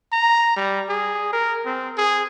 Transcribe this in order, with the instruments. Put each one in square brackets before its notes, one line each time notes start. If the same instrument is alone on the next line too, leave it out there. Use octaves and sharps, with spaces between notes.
[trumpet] A#5
G3
G#4
A#4
C4
G#4